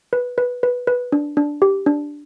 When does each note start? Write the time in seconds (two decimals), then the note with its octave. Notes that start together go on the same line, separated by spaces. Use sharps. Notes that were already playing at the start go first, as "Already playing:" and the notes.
0.13 B4
0.38 B4
0.63 B4
0.87 B4
1.12 D4
1.37 D4
1.62 G4
1.86 D4